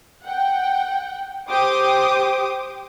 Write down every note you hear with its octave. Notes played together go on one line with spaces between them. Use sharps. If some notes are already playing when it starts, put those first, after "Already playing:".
F#5 G5
G4 C5 D6 D#6